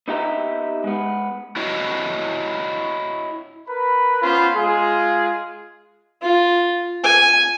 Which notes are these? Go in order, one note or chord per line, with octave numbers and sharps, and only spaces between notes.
B3 D#4 G4 E5 A#5
G#3 B3
E4 F#4 C#5 D#5
A#4 B4 B5
B3 C#4 F4 C5 B5
G#3 F4 G#4
F4
G#5